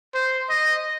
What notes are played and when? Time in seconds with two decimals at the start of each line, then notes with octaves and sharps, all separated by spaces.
0.14 C5
0.50 D#5